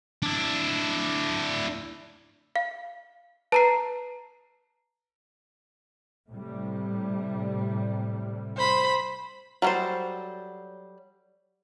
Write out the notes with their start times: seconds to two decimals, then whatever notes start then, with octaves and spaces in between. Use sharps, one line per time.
0.22 D4 E4
2.56 F5
3.52 B4 A5 A#5 C7
6.29 A2 C3 G3
8.57 C5 B5
9.62 F#3 G3 F#4 A4 C5